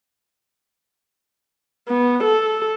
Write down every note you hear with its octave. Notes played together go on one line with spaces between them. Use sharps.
B3
A4